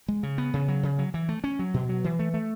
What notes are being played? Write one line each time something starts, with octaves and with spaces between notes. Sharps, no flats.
G#3
C#3
B3
C#3
F#3
C#3
F#3
E3
A3
C#4
F#3
B2
F#3
E3
A3
A3